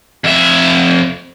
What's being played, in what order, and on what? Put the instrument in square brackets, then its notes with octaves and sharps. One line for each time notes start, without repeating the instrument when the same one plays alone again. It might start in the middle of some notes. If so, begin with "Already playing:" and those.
[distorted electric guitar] F2 E5